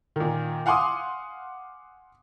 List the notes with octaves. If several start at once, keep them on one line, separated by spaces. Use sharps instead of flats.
A#2 D#3
F5 F#5 G#5 C6 D6 D#6